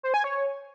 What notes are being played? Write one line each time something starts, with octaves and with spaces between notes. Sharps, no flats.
C5
G#5
C#5